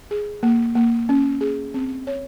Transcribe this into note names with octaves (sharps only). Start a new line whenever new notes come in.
G#4
A#3
A#3
C#4
G#4
C4
C#5